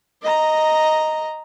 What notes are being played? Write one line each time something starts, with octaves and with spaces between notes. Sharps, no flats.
D#5 A#5